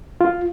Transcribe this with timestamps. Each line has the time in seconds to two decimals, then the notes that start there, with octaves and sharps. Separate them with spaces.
0.21 F4